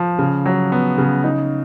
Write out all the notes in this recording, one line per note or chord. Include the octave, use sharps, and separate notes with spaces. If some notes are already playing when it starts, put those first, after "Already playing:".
Already playing: F3
C#3
F#3
B3
C#3
D#4